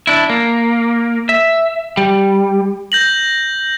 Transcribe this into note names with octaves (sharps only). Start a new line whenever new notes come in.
D4 E4
A#3
E5
G3
G6 A#6 F#7